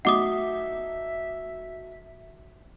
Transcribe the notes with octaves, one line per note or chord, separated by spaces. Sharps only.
F#3 A3 D#4 E5 F#5 D6 D#6